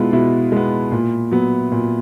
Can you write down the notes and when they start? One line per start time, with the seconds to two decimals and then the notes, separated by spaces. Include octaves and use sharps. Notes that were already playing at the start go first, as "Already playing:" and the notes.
Already playing: B2 G#3 B3 E4 F4
0.13 B2 E4
0.52 G#3 B3
0.92 A#2
1.31 F#3 B3
1.72 A#2